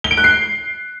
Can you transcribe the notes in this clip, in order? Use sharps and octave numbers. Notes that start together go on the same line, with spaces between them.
G7
D7
F#6
C7